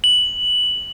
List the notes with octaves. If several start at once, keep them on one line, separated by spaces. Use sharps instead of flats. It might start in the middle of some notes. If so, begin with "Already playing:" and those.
F#7